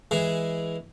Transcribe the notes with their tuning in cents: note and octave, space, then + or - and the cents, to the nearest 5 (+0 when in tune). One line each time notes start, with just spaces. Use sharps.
E3 +0 G#3 +0 G#4 +0